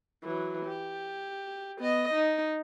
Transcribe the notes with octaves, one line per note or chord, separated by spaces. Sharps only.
E3 F#3
G4
B3 D#5
D#4